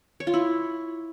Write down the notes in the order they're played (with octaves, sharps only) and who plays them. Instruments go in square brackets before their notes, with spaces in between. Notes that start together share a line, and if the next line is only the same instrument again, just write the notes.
[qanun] C#5
F4
E4